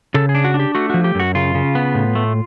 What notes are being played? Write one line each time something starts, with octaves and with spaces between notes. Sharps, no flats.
C#3 A4
G#4
D4
F#4
D4
G4
A3 F#4
F3 F#4
G4
F#2 F#4
C#3 F4
C#3
B3
A2
A3